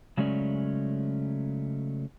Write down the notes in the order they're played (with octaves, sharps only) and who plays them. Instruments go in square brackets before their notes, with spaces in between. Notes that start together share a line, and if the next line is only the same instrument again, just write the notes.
[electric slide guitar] C#3 F#3 G#3 A3 C#4 D5